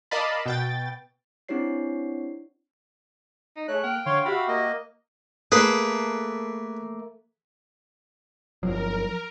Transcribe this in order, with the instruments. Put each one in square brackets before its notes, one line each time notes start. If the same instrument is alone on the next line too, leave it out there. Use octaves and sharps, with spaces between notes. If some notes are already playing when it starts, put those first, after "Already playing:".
[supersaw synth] A#4 D5 D#5 F5 A5 B5
B2 G5 A6
[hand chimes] C4 D4 E4 G4 C#5 C7
[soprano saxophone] D#4
[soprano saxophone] A3 [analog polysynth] G#4 C#5 [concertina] F#6
[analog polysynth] A#3 F6 [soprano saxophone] G5
[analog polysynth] D3 [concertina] C#5 F5 C6
[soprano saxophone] F#4 [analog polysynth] G4 E5 [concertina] F5 B5
[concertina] A#3 D#5
[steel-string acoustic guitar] A3 A#3 [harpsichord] G#4 B4
[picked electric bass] G1 C2 F#3 [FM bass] F3 [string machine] A#4